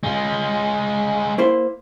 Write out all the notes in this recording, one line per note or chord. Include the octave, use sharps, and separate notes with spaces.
G#3 F4
A#3 E4 C5